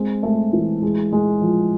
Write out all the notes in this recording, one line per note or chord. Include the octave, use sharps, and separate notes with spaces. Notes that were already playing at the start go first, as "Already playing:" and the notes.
Already playing: G#3 C4
A3
E3
G#3
G#3
F3